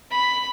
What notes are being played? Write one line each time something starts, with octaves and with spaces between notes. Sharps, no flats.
B5